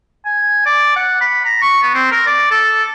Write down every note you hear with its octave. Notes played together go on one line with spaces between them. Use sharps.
G#5
D5
F#5
B5
A#5
C#6
B3
C4
A#4
D5
A4